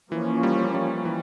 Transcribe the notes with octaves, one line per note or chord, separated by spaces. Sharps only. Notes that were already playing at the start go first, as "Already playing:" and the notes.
E3 F3 A#3 C#4
G3
G3
E3